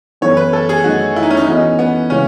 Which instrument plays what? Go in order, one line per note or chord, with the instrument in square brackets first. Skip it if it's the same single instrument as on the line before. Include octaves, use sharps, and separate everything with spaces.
[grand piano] F#2 E3 B3 E4 A4 [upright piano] C#5
[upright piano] B4
A4
G#4
[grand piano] F#2 D#3 A3 D#4 [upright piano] F#4
[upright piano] E4
D#4
C#4
D#4
[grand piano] E3 B3 F#4 A4 D#5 [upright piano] C#4
[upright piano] B3
[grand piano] C#3 E3 G#3 [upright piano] C#4